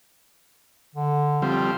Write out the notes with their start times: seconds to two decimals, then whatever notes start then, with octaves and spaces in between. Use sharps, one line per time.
0.95 D3
1.42 F3 G3 C4